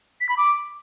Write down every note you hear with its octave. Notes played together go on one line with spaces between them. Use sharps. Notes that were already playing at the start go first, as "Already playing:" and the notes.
B6
B5
D6